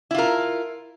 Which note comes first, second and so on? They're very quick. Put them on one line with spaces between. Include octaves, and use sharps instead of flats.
E4 F4 A#4